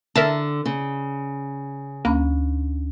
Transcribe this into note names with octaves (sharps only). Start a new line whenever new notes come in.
D3 A#4 E5 A5
C#3
D2 A#3 C#4 B5